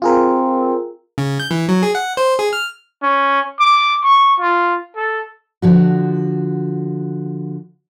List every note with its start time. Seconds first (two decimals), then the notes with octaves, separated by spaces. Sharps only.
0.02 C4 F4 G#4 A#4
1.18 C#3
1.40 G6
1.51 E3
1.69 F#3
1.83 G#4
1.95 F#5
2.17 C5
2.39 G#4
2.53 F6
3.02 C#4
3.60 D6
4.03 C#6
4.40 F4
4.96 A4
5.62 D3 F3 F#4